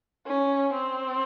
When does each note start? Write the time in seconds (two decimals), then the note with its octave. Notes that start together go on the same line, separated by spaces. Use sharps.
0.27 C#4
0.73 C4